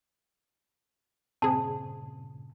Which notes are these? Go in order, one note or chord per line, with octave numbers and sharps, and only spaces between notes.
G2 A#2 C#3 C4 G#4 A5